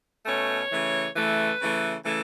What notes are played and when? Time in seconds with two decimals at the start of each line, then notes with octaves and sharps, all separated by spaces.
0.26 B2 A3 C#4 C#5
0.71 C#3 E3 A3
1.15 C#3 E3 A3 B4
1.60 C#3 E3 A3
2.04 C#3 E3 A3 A4